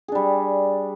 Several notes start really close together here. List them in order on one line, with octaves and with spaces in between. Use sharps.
G#4 D4 G3